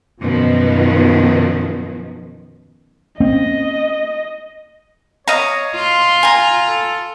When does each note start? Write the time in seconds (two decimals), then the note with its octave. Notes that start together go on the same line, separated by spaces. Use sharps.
0.20 F#2 B2 D#3 F3
3.20 A#3 C4 C#4 D#5
5.28 C#5 D#5 F5 A#5
5.75 F4 C6
6.23 G#5 A#5
6.66 A4